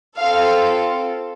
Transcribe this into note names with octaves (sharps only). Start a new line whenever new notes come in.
C4 F4 A4 F5